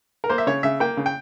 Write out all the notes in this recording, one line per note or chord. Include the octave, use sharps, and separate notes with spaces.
A#4
A#3 C5
E5
C#3 C#5
C#3 E5
A#3 G5
C#3
G5